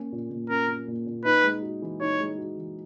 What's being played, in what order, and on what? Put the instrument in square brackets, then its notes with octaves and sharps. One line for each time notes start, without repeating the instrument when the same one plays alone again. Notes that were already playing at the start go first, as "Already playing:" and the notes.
Already playing: [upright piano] A#3 C#4
A#2
A#2
[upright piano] C#4 [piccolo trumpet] A#4
[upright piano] A#3
A#2
A#2
[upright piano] D#4 [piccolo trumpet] B4
[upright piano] G#3
F#4
E3
[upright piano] D#4 [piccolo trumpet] C#5
[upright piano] G#3
F#4
E3